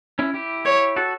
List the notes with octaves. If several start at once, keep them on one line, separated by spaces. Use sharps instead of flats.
C#4 E4
E4 G4
C#5
F#4 A4